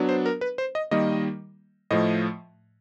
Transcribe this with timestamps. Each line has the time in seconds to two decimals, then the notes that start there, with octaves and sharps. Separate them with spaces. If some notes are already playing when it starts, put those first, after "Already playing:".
Already playing: F#3 B3 D4
0.09 C5
0.26 A#4
0.41 B4
0.58 C5
0.75 D#5
0.91 D#3 G3 A#3 D#5
1.91 A2 F3 A3 D#5